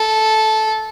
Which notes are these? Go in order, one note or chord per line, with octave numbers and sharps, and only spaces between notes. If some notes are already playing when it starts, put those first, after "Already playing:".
Already playing: A4